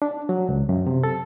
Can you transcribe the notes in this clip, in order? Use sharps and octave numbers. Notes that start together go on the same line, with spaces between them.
D4
F#3
C#2
F#2
C3
A4